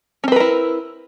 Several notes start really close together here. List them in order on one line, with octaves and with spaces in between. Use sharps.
C#4 C4 B4 A#4 E4